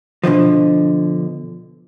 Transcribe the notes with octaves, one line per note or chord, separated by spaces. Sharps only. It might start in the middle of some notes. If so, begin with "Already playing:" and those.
B2 D3 D#3 F3